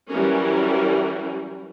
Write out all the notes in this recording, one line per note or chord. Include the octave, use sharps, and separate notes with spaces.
E3 F#3 G3 C#4 A#4